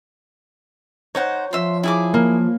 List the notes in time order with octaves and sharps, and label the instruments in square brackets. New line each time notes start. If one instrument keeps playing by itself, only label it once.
[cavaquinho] D#4 C5 F#5 [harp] C#5
[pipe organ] F3 [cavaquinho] E5 C6
[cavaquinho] E4 G#4 D6
[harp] A#3